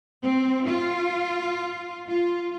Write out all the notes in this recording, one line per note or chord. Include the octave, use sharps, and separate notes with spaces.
C4
F4
F4